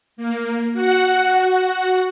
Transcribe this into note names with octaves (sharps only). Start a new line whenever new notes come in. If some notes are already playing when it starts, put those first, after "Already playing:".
A#3
F#4 F#5